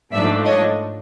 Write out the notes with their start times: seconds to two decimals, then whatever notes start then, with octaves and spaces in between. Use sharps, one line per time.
0.13 G#2 F3 A3 D4 D5 E5
0.45 C#5 D#5